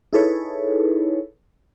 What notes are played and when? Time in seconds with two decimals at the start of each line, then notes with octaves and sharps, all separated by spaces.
0.13 D#4 E4 G#4 A4 B4 C#5